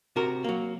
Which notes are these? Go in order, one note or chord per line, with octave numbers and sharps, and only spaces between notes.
C3 F#4 A#4
F#3 A#3